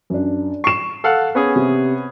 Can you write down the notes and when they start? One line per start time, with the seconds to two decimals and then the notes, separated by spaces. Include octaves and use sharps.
0.10 F#2 D4
0.64 C#6 C7 E7
1.04 A4 F5 F#5
1.35 B3 C#4 G#4
1.56 C3